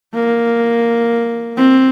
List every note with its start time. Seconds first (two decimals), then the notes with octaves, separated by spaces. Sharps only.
0.15 A#3
1.57 C4